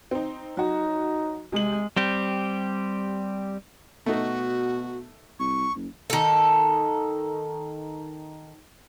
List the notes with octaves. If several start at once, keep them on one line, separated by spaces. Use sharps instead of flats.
C4 D#4
F#3 D#4 F#4
C3 G#3 F#7
G3 C4 G4
B2 A3 D#4 F#4
C2 C#6
F#1
D#3 A4